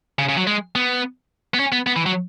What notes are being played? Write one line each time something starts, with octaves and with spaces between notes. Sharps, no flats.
C#3
C#3
F#3
G#3
B3
B3
C#4
B3
B3
E3
F#3